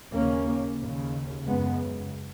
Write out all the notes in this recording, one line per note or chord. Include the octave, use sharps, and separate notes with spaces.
D#2 C#3 A#3 C#4
D#2 C#3
F#2 C#3 G#3 B3